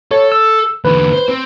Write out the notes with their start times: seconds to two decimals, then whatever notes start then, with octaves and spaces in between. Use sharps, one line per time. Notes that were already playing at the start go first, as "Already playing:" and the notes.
0.11 A4 C#5
0.32 E6
0.85 E2 D3 B4
1.13 C5
1.29 C4